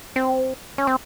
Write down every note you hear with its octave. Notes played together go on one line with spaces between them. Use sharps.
C4
C#4
C4